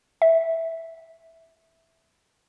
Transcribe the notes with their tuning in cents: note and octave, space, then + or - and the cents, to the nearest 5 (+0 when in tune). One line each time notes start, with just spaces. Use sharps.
E5 -5